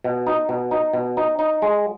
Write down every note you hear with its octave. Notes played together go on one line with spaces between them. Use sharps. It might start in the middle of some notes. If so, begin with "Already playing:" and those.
B2
D#4
B2
D#4
B2
D#4
D#4
G#3